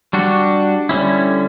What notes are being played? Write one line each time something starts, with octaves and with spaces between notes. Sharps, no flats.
G3 D4 F#4
D3 G3 C#4 E4